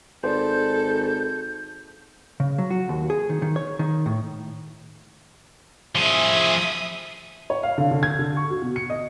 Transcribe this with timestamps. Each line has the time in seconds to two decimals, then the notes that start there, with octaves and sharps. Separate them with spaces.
0.23 G#1 A4 C5 D5 G6
2.40 C#3
2.58 F#3
2.70 F#4
2.89 D#2
3.10 G#4
3.30 D#3
3.42 D#3
3.56 C#5
3.79 D#3
4.06 A2
5.95 F3 G#4 E5 D#6
7.50 C#5
7.63 F5
7.78 D3
7.91 D3
8.03 G#6
8.19 D3
8.37 C#6
8.50 F#4
8.62 B2
8.76 C#7
8.90 D#5